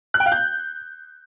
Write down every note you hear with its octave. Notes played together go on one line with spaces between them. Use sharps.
F#6
G5
F5
G6